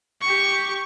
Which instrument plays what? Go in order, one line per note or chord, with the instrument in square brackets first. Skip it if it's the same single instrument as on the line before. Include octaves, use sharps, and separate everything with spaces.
[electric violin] G4 C#6